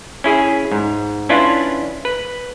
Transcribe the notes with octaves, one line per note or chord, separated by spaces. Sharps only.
C#4 E4 G#4
G#2
C#4 D4 E4 F4 B4
B4